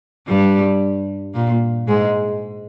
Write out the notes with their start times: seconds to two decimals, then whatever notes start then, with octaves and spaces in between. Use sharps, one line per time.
0.28 G2 G3
1.34 A#2 A#3
1.88 G#2 G#3